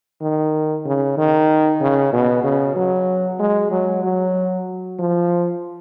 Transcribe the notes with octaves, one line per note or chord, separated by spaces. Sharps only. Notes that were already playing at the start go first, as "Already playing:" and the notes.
D#3
C#3
D#3
C#3
B2
C#3
F#3
G#3
F#3
F#3
F3